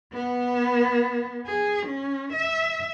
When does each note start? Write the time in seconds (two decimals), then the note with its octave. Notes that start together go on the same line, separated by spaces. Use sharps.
0.12 B3
1.46 G#4
1.86 C#4
2.33 E5